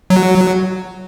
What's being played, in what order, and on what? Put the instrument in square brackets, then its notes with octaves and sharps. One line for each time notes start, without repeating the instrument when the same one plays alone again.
[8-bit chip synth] F#3